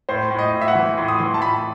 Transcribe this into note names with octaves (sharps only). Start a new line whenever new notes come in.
A2 C5
A2
D#5
A2
E5
F#5
E3
A2 C6
D#6
E3 C6
A5
A2 B5